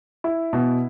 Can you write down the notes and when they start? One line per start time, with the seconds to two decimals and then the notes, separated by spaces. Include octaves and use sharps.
0.24 E4
0.53 B2